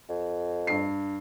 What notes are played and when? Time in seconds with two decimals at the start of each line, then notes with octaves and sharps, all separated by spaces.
0.09 F2
0.67 G2 C7